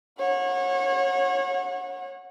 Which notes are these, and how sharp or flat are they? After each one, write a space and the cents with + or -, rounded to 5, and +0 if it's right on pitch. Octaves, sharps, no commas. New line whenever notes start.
C#5 -30 F#5 -25